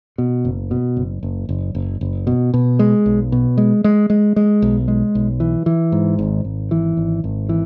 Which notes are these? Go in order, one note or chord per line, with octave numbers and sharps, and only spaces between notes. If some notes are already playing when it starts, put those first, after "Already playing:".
B2
F#1
B2
F#1
F#1
F#1
F#1
F#1
B2
B2
G#3
B1
B2
G#3
G#3
G#3
G#3
B1
G#3
B1
E3
E3
G#2
G#1
G#1
E3
G#1
G#1
E3